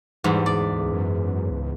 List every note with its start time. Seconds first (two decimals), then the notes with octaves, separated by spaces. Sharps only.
0.24 E2 G#2 G3
0.46 D2 D5
0.93 F#2
1.51 C#2